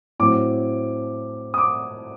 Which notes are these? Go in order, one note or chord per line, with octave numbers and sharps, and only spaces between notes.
A2 F#3 A3 C4 D6
D#6
D6